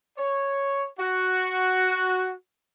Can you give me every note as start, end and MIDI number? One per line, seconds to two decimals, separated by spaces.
0.17 0.85 73
0.99 2.32 66